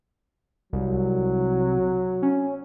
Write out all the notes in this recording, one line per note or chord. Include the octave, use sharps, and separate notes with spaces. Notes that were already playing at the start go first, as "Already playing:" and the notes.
C2 F#3
C#4